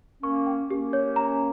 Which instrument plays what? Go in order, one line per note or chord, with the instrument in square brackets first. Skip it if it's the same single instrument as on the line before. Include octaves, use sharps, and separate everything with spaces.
[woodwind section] A#3 C#4 [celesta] C#6
[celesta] G5
[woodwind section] A#3 C#4 [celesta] G4
[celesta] C#5
A#5